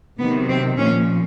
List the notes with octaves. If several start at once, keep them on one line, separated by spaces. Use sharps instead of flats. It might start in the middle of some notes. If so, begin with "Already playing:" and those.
C3 D#3 F#3 B3
C4
A#2 F3 C#4